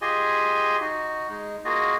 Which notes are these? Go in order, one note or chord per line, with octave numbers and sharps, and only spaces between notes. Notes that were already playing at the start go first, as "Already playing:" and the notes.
F4 G4 G#4 D#5 G#5 C6
D#4 F#4
G#3 D#4
A#3 F4 F#4 G#4 D#5